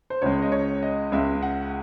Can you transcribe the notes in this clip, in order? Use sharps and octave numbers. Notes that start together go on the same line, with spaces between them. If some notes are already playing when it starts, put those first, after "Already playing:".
C5
C#2 C#3 G#3 C#5
D#5
C#5
D#5
C#2 C#3 G#3 E5
F#5